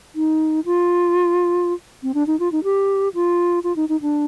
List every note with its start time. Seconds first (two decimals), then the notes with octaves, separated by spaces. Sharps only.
0.15 D#4
0.66 F4
2.03 C4
2.14 D4
2.27 D#4
2.40 F4
2.52 D#4
2.64 G4
3.14 F4
3.64 F4
3.76 D#4
3.89 D#4
4.02 D4